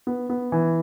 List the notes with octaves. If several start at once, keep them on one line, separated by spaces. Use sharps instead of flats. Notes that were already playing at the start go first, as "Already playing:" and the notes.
B3
B3
E3